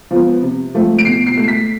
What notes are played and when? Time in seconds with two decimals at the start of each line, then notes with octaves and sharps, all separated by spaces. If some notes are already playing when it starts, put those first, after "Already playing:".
0.11 F3 B3
0.42 C3
0.74 F3 A3
0.99 D7
1.05 B2 C7
1.27 C7
1.37 A3 C7
1.48 B6